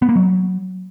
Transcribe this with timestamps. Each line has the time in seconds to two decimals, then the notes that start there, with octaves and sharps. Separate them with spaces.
0.02 B3
0.09 A#3
0.15 F#3